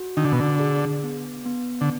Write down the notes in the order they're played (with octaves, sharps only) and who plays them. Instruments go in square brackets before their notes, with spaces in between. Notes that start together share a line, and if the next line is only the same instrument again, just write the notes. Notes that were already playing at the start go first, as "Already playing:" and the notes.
Already playing: [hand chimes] F#4
[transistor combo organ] D#3 [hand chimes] D4
[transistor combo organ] D3
B2
D3
[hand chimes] G#4
B3
B3
[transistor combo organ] D3